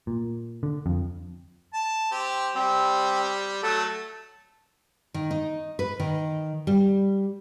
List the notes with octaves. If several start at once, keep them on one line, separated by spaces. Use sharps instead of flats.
A#2
D3
F2
A5
C4 G4
G3 C4
F#3 A3 A4
D#3
D#4
B4
D#3
G3